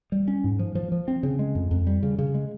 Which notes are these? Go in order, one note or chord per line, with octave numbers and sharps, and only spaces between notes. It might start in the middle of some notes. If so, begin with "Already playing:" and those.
G3
C#4
G#2
F3
F3
F3
C4
C#3
G#3
F2
F2
G3
C#3
C#3
G#3